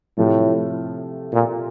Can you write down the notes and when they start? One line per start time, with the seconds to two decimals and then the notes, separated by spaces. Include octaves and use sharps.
0.17 A2 C3 F3 A3
1.33 A#2